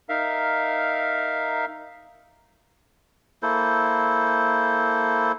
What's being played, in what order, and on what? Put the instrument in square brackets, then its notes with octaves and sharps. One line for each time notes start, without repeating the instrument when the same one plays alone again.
[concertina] D#4 A#4 E5 F5
[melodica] A#3 E4 A4 C5